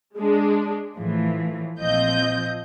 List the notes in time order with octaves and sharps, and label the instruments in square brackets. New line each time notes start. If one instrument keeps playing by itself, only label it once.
[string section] G#3 D4
A2 E3 F3
A#1 F3 C4 D#5 G6